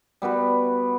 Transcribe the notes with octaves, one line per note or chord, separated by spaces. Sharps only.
G3 B3 F#4 B4